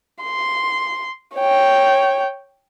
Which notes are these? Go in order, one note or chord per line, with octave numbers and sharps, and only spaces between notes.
C6
C#5 G5